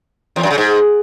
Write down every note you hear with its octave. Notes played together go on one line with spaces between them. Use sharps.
E2
F#2
C#3
G#2